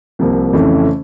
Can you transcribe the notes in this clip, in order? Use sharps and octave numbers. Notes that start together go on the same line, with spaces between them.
C2 C3 F3 A#3
F2 C#3 E3 A3 C#4